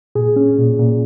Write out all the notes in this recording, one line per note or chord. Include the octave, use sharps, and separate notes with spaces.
A#2 G#4
C#4
A#2
A#2